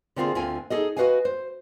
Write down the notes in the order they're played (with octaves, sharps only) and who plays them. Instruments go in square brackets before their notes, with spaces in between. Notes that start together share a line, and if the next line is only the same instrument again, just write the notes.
[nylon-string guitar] D3 A#3 C4 F4 F#4 G#4
D2 D3 C4 F4 G#5
D#4 G#4 A4 D#5
F#4 A4 B4 D#5 F5 G#5
C5